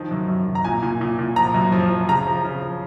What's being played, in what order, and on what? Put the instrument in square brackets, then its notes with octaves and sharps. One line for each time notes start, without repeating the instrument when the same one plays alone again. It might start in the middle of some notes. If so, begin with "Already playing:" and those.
Already playing: [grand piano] D#3 F3
F#2
F#2
F#2
A#5
A#2 G#5
A#2
A#2
A#2
F3 A#5
F#2
F3
F3
C#3 A#5
F3
C#3
F3